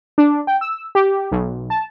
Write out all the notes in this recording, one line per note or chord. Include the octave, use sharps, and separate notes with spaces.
D4
G5
E6
G4
B1
A5